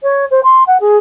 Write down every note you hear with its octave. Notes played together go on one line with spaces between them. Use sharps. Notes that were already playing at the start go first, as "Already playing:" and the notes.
C#5
C5
C6
F#5
G#4